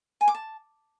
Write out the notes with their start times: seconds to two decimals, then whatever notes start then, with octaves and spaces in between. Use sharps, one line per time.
0.21 G#5
0.28 D6
0.35 A5